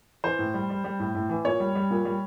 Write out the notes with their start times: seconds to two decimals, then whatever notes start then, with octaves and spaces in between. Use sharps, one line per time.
0.24 E3 C5
0.39 A2
0.54 G3
0.70 G3
0.84 G3
1.00 A2
1.15 A2
1.29 E3
1.45 A#2 C#5
1.60 G3
1.75 G3
1.90 A#2
2.05 G3